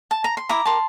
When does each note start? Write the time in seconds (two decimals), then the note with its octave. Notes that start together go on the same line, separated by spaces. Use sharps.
0.11 A5
0.24 A#5
0.37 C6
0.49 E4 A#5 D6
0.65 G4 A#4 A5 C6